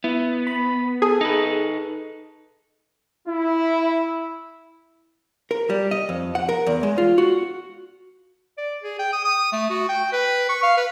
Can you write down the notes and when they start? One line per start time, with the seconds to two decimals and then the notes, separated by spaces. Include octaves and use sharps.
0.04 B3 E4
0.47 B5
1.02 G#4 A4
1.21 D#4 B4
3.27 E4
5.51 A#4
5.70 G3
5.91 D#5
6.09 F2
6.35 F#5
6.49 A#4
6.66 E2
6.83 G#3
6.98 F4
7.18 F#4
8.58 D5
8.83 G#4
8.99 G5
9.13 D#6
9.25 D#6
9.52 A3
9.70 F#4
9.89 G5
10.13 B4
10.49 C#6
10.63 F5
10.77 B4